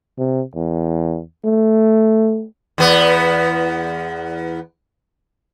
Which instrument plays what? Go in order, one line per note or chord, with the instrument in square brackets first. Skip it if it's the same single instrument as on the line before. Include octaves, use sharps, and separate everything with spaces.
[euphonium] C3
E2
A3
[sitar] E2 B3